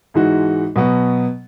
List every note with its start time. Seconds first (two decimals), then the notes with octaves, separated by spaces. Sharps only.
0.14 G#2 E3 G#3 D#4 F#4
0.76 B2 F#3 B3